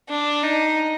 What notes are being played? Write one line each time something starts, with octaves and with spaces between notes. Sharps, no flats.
D4
D#4